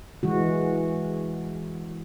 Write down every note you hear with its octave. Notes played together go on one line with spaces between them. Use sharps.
E3 G#3 F#4